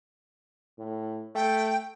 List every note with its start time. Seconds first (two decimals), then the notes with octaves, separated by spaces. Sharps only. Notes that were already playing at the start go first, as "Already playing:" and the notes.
0.78 A2
1.35 A3 G5